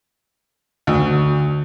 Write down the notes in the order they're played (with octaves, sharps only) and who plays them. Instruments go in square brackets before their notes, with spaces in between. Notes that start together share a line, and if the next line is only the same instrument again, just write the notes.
[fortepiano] D2